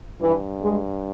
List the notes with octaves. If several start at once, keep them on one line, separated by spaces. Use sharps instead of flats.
G2 E3
G#3